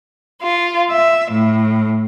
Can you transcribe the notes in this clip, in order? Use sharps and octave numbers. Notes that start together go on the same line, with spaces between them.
F4
E5
A2